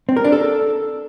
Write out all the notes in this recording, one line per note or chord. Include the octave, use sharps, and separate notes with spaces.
C4
A#4
D4
A4